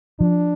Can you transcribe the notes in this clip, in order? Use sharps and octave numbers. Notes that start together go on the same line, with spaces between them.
F3 D4